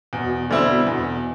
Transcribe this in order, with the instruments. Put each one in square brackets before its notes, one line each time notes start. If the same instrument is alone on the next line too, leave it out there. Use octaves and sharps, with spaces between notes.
[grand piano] E2 [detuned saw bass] B2
[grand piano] D3 G3 C4 E4
E2